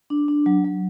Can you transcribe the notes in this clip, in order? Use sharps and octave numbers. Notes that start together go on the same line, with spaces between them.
D4
D4
F#3
F#3